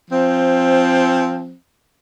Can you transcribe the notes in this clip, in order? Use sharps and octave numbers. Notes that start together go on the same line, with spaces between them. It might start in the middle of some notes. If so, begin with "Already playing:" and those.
F3 C4